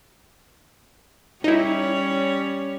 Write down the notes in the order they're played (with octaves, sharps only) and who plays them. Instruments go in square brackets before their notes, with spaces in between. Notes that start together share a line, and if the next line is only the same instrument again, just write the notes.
[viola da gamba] G3 C#4 C#5 [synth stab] D#4 E4